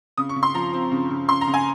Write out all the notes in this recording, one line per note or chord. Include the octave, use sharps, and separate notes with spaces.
C#3 D#6
C#6
C#3
C6
F3 A#5
C4
C#3
C#3
C#3 C6
A#5
C#3
G#5